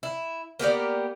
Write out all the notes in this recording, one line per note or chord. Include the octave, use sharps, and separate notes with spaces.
E4
A#3 B3 G4 D5